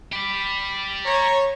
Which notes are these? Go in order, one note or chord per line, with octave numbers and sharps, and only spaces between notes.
G4 D5 B5
C#5 A#5